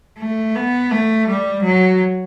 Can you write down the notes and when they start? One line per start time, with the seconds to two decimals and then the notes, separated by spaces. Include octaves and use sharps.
0.19 A3
0.56 B3
0.91 A3
1.28 G3
1.63 F#3